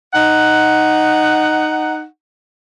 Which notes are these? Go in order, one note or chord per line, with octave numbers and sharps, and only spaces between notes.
D#4 F#5